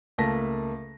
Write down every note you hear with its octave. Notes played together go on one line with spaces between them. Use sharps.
C#2 A3 A#3 A5 A#6 B6